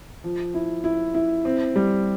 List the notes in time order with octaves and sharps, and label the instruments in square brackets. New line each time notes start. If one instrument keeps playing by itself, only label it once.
[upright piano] F3
E4
E4
E4
C4
G3